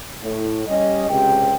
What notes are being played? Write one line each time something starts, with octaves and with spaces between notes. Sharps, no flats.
A2
G3 C#4 G4 D#5
C#2 C3 G5